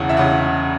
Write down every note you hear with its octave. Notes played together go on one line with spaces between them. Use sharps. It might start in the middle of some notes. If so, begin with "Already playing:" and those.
Already playing: E1 E2 C#3 F#5
E5
F#5
C#3